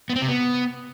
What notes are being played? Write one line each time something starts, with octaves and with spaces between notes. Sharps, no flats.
B3
C4
C3
B3